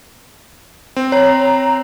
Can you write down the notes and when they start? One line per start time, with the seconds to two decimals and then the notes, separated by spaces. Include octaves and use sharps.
0.96 C4
1.12 C#5 A#5